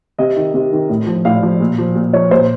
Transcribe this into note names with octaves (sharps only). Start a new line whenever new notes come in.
C3 D#5
D#3
C3
D#3
A2
F3
A2 F5
F3
A#2
F3
A#2
F3 C#5
A#2 C5